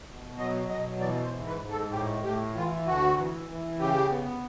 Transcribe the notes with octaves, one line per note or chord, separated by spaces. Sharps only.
B2
F#3 D#5
B2 D#5
E3 D5
C5
G#2
B4
G#2
A4
A2 G4
A2 G4
E3 F4
D2 F#4
E3
E3
C#3 G4
B3